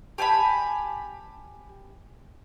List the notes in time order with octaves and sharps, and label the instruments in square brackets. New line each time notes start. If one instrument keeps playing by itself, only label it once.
[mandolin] G4 G#5 A5 B5